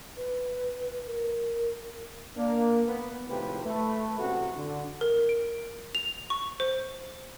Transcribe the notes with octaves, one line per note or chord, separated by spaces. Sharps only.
B4
A#4
A#3 D4
B3
G#1 A2 C3 F3 G4 B4
A3 B4
A1 C3 F#4
D3
A#4
D7
F7
C#6
C5